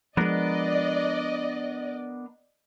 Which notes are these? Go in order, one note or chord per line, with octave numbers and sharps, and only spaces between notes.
F3 G#3 B3 D4 A#4 D5 D#5